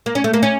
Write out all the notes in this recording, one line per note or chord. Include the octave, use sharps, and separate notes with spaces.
A#3
C#4
A3
A#3
C#4